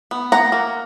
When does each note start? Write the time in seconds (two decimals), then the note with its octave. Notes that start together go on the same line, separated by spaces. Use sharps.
0.11 B3
0.32 A#3 F#5 A#5
0.52 A#3